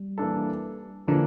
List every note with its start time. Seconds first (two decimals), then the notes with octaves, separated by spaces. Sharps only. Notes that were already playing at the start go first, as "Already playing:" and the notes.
Already playing: G3
0.18 E3 A#3 D4 A4
1.07 D3 E3 F3 A#3 D4 A4